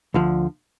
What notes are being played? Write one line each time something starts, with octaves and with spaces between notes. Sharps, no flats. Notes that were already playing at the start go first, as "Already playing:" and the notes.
D2 D3 F3